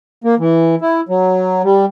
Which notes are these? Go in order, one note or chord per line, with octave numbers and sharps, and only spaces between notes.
A#3
E3
E4
F#3
G3